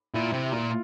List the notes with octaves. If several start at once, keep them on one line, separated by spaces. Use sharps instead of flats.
A#2 E4
C3
A#2 F4